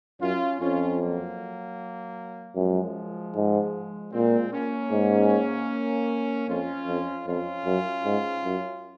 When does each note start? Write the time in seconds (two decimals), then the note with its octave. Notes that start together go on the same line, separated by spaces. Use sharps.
0.20 F#2 C#4 F4
0.60 F2 C#4 F4
0.99 F#3 A#3
2.56 F#2 F3 G#3
3.35 G#2
4.13 A#2 G#3 C4
4.52 A#3 C#4
4.91 G#2
6.48 F2 C#4 F4
6.87 F2
7.26 F2 C#4 F4
7.66 F#2
8.05 G#2
8.45 F#2